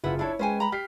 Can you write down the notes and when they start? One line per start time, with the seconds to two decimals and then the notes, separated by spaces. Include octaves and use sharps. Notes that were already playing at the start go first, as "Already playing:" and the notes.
0.04 F#1 E4 F4 B4 F#5
0.19 D4 E4 A4 C#5
0.39 G#3 C#4 B4 C5 G5 G#5
0.60 A#5 B5
0.72 G4 F6 B6 C7